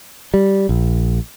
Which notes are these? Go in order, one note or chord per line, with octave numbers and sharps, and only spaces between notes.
G3
A#1